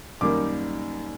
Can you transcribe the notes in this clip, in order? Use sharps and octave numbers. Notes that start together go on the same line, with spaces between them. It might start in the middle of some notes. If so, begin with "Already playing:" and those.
F#2 D#3 G3 A#3 D6